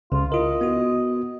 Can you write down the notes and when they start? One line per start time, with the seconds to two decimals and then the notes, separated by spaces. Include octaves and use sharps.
0.12 C#2 C#3 F4
0.32 E4 F4 A#4 D#5
0.61 B3 F#4